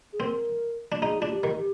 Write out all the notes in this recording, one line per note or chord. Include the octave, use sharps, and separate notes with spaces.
G#4
C4 A#4
D4
D#4 G#4
D4 F4
G4
D#3
G4